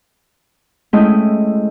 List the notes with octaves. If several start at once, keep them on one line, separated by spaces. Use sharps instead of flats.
G#3 A3 C#4 E4 D#5 G5